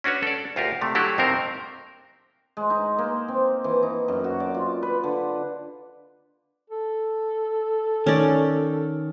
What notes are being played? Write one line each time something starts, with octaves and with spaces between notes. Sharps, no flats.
C#4 D4 F#4 B4 C#5
A4 D5
D2 F4 G4 A#4
C3 A3
F#3 A3 D4 E4 F#4 G4
F2 C3 C4 D#4 A#4 C5
G#3
D#4
A#3
C4
E3
D#4
F#2
F#4
D5
F4
B4
D3
A4
D#3 C#4 D5